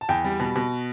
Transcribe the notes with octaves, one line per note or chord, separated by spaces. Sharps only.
A5
E2 G5
G3
B2
B2